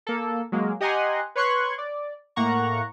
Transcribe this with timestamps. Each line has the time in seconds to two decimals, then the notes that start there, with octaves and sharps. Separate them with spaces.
0.07 A#3 A4
0.52 F#3 G#3 A#3
0.80 G4 D#5 F#5 G#5 A#5 C6
1.35 B4 C#5 C6 C#6 F#6 G#6
1.78 D5
2.36 A2 A#3 F#5 A#5 C#6